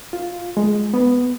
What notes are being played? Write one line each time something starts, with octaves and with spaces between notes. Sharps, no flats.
F4
G#3
B3